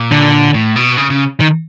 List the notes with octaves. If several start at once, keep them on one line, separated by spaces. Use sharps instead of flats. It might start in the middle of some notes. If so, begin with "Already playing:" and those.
Already playing: A#2
D3
A2
B2
C#3
C#3
D#3